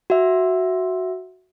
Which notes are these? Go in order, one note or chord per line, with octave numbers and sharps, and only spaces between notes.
F#4 E5